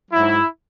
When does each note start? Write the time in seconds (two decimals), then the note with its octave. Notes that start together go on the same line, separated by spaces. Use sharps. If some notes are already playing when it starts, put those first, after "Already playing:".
0.11 G#2 F#3 E4